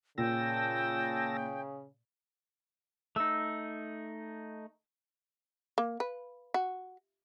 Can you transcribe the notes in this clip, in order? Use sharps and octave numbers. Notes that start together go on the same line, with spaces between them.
A#2 C#3 G5 A5 E6 A#6
A3 D#4 E6
A#3
B4
F#4